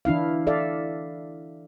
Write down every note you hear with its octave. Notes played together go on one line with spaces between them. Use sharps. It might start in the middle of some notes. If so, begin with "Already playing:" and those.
E3 D4 E4 F5
A4 D5 E5 F5